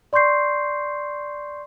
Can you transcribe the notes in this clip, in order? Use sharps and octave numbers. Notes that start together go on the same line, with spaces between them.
D5 C6 C#6 G6 C7